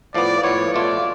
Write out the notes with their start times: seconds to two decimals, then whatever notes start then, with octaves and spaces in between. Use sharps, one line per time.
0.14 A2 F3 B3 D5
0.43 A2 F3 B3 C#5
0.73 B2 A3 F4 D5